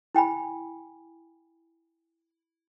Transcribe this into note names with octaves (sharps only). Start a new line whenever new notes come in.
E4 G5 G#5 B5